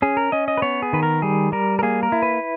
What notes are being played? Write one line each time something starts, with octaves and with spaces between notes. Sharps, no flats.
C#4 G#4
A#4
C#4 D#5
D#5
B4
B3 C#5
G#4
D#3 B4
A#4
G3 G#4
G3 A#4
A#4
A#3 G#4
A#4
E4
B4